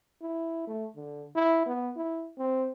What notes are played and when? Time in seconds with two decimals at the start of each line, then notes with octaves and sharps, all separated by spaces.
0.22 E4
0.67 A3
0.96 D3
1.35 E4
1.67 B3
1.96 E4
2.38 C4